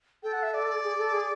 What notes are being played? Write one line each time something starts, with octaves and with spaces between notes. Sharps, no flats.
A4 G5
F#5
E5
D5
G#4
A4
G#4